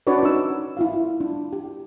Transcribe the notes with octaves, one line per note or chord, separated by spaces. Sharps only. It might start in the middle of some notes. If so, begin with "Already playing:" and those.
C#4 D4 F#4 B4 C#5 D5
D#4 E6
E4 F4 F5
D4
G4